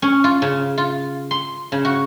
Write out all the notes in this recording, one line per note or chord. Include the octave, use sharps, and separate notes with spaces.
C#4
F4
C#3
F4
C6
C#3
F#4